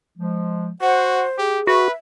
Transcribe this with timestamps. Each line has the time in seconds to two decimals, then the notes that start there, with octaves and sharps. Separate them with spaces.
0.18 F3 G#3
0.82 F#4 C5 F#5
1.38 G4 G#4
1.67 F#4 B4 E5